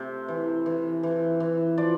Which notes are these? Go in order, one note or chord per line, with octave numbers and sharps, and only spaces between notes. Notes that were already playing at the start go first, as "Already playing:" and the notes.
Already playing: C3 A3 E5
E3
E3
E3
E3
F3 D5